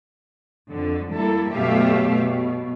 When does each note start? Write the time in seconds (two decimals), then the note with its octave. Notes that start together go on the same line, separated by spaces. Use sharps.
0.70 F2 D3
1.13 G3 A#3 E4 A4
1.51 F#2 B2 A3 G4 E5 F5
2.17 B2